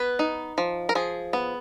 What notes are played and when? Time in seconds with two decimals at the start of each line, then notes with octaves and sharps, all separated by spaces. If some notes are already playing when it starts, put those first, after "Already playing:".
Already playing: B3 B4
0.19 D#4
0.58 F3
0.89 A#4
0.95 F3 G#4
1.33 B3